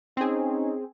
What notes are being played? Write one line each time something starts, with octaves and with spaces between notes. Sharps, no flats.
C4 C#4 D#4 G#4